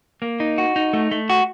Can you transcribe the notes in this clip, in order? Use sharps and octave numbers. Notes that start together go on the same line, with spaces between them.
A#3
D#4
F#4
D#4
A3
A3
F#4